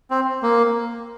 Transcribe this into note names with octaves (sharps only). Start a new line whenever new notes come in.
C4
A#3